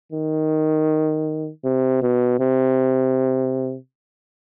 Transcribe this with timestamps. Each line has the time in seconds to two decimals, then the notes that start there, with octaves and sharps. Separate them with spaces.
0.12 D#3
1.64 C3
2.02 B2
2.40 C3